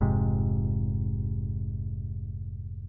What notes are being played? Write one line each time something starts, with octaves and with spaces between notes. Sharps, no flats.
F1 G#2 C3